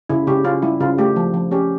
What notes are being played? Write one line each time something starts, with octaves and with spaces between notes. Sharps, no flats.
C#3 E4
C#3 G4
C#4 F4
G3 E4
C#3 F4
A3 G4
F3
F3
C#4 G4